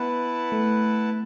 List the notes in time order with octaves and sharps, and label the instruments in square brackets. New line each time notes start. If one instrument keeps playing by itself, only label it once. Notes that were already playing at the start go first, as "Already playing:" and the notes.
Already playing: [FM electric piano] B3 [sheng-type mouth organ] E4 B4 F#5 A5
[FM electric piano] A3